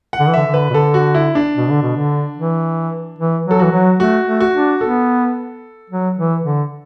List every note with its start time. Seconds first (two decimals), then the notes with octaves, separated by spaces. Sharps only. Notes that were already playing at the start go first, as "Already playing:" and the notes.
0.13 F#5
0.20 D3
0.28 E3
0.34 D3 E5
0.47 D3
0.54 B4
0.70 B2
0.74 D3 A4
0.94 F#4
1.15 E4
1.35 D4
1.56 B2
1.70 D3
1.82 B2
1.96 D3
2.37 E3
3.19 E3
3.46 F#3 A4
3.59 E3 F#4
3.72 F#3
3.99 A3 F#4
4.26 A3
4.40 F#4
4.54 D4
4.81 B3 A4
5.90 F#3
6.17 E3
6.44 D3